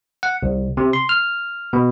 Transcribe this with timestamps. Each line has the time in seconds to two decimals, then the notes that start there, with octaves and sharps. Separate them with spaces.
0.23 F#5
0.42 C2
0.77 C3
0.93 C6
1.09 F6
1.73 B2